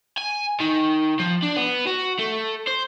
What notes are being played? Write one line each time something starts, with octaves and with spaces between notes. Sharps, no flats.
G#5
D#3
F3
D4
B3
F#4
A3
C5